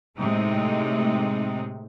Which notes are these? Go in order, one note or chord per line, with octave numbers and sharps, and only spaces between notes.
A2 C3 G#3 A3 D#4